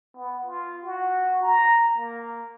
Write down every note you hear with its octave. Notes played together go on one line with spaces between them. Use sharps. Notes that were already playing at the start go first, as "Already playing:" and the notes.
B3
F4
F#4
A#5
A#3